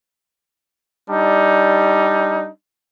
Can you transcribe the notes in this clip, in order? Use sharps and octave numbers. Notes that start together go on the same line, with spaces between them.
G3 D4 D#4